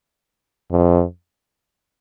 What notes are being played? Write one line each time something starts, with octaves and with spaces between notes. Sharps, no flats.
F2